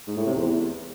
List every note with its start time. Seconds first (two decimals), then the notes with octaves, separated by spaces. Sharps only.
0.08 G#2
0.17 A2
0.26 C3
0.36 E2